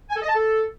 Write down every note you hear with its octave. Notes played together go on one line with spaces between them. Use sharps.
G#5
A4
D#5
A5
A4